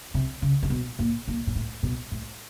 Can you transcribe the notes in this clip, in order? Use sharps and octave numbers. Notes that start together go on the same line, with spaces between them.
C3
C#3
C3
B2
A#2
A#2
A#2
A2
B2
A2